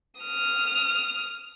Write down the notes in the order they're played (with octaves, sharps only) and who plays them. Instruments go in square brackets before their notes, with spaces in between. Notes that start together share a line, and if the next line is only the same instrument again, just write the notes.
[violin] D#6 F6